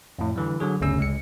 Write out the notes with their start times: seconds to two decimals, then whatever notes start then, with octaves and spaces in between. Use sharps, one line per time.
0.19 F2 A2
0.36 D3 E3 G3
0.60 D3 F#3 G#4
0.81 G1 D2 C#3 C#4 E6
0.98 C#2 G#3 C#7